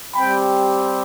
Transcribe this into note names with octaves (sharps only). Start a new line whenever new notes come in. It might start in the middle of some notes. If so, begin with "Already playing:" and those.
G3 C4 G4 G5 B5